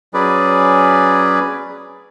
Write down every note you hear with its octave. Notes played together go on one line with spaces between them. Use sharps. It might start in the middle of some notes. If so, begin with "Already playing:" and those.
F#3 C#4 G#4 B4 D5